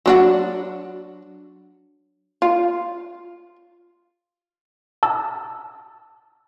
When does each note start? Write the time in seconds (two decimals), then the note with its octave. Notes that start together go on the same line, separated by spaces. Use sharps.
0.06 F#3 D4 F#4
2.42 F4
5.03 A5 E6